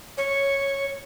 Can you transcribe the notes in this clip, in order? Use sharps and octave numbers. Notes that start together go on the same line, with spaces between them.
C#5